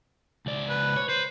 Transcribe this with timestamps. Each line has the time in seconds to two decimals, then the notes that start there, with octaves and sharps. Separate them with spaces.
0.46 C#2 D5
0.70 B4
0.96 C#5
1.09 B4 C5